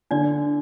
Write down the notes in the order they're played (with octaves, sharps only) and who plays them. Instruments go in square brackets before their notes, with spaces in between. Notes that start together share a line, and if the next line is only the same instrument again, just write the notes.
[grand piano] D3 [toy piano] D4 D5